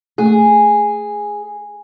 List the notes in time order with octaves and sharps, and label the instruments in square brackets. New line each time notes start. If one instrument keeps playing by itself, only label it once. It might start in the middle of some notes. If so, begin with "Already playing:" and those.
[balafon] A3 [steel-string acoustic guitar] G#4